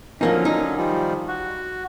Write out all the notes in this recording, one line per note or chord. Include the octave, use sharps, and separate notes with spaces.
D3 F3 F#3 A#3 C#4 D#4
D#4
D#3 F3 G3
F#4